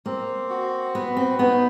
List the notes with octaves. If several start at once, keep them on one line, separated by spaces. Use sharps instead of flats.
A#3 C4
F#4
B3 B4
C4
B3 D#4